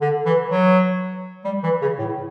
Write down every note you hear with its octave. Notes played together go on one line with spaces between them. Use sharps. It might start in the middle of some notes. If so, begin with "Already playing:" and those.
D3
E3
F#3
G3
E3
C#3
A2